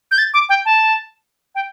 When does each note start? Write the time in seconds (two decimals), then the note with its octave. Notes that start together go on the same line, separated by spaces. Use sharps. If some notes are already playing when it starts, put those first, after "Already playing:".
0.11 G6
0.18 A6
0.34 D6
0.49 G5
0.65 A5
1.55 G5